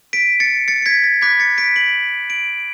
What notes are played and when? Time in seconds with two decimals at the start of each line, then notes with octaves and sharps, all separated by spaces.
0.13 B6 D7
0.40 A6 C#7
0.68 A6 C#7
0.82 C#7
0.86 G#6 B6
1.04 A6
1.21 B5 D6 F#6 G#6 B6
1.40 A6 C#7
1.57 B6 D7
1.76 D7 F#7
2.30 D7 F#7